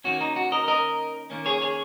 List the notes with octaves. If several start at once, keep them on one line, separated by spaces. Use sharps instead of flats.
D#3 A#3 C#4 F#4
D#4
F#4
A#4 D#5
A#4 D#5
D#3 A#3 C#4
G#4 C#5
G#4 C#5